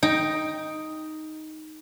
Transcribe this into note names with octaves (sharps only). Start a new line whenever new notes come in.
D#4 G5